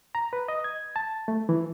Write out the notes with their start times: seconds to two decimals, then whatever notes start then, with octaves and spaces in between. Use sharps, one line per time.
0.15 A#5
0.33 B4
0.48 D#5
0.64 G#6
0.96 A5
1.28 A3
1.49 E3